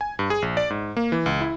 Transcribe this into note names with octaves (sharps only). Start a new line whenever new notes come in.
G#5
G2
G#4
A#1
D5
G#2
A#3
E3
C#2
E4